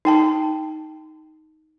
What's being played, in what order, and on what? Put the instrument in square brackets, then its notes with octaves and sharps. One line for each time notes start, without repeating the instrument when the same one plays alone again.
[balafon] D#4 G5 A5